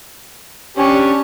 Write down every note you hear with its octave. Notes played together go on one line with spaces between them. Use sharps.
C#4 D4 G4